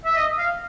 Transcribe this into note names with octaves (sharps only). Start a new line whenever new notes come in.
E5
D#5
F5